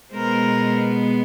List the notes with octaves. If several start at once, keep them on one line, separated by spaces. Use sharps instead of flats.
B2 G#3 B3 A#4 C5